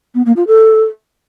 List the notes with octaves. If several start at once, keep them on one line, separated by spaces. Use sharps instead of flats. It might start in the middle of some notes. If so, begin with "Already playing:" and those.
B3
A#3
F4
A4